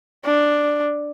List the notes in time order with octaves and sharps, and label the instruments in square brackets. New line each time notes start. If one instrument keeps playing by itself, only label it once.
[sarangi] D4